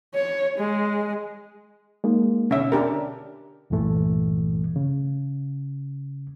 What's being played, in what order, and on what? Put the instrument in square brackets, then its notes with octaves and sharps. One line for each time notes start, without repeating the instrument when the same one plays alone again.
[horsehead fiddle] C#5
G#3
[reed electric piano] G#3 A#3 D#4
[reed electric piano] B2 D3 [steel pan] C#4 E5
[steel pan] D4 G4 A#4
[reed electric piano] C2 G2 A#2 E3 A3
C#3